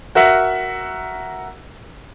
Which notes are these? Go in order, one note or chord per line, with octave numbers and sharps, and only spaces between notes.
F#4 A#4 E5 F#5